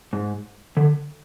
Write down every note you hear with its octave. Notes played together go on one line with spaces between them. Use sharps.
G#2
D3